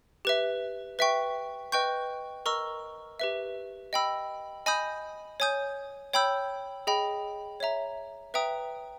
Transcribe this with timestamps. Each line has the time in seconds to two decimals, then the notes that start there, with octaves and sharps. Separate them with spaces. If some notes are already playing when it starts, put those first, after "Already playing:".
0.25 G4 B4 E5
0.99 B4 E5 G5 C#6
1.72 B4 D#5 G5 C#6 G6
2.46 A#4 D#5 A#5 C#6 E6
3.20 G4 B4 E5
3.93 D#5 G5 B5 E6
4.66 D#5 G#5 B5 D#6 G6
5.40 C#5 G#5 D#6 G6
6.13 C#5 G5 B5 E6 G6
6.87 G#4 D#5 G5 B5
7.60 C#5 E5 A#5
8.34 B4 E5 G5 A#5 D#6